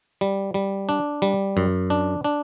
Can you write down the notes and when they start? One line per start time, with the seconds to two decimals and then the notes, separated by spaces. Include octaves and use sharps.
0.21 G3
0.54 G3
0.89 D4
1.22 G3
1.57 F#2
1.90 D4
2.24 D4